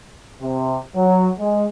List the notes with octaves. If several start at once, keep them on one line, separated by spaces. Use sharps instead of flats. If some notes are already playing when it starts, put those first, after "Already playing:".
C3
F#3
G#3